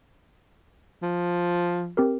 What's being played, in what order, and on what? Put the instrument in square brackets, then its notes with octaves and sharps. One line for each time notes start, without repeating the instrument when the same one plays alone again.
[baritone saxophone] F3
[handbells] C4 G4 A#4